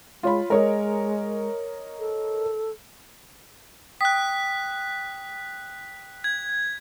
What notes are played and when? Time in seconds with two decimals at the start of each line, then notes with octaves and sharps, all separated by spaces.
0.23 G#3 F4 C#5 B5
0.50 G#3 A#4 C#5 D#5
1.99 A4
4.01 G5 D#6 F#6 B6
6.24 G#6